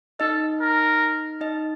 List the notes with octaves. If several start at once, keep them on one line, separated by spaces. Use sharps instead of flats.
D#4 A4 D#5
A#4
D#4 D#5